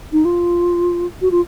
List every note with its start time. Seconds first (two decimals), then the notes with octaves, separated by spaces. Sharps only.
0.13 D#4
0.25 F4
1.22 F#4
1.31 F4